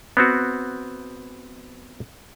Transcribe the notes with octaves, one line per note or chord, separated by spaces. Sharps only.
B3 C4 F#4